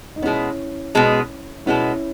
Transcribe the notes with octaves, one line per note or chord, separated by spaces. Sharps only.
D#4
B2 G#3 B3 C#4 E4
B2 G#3 B3
B2 G#3 B3 C#4 E4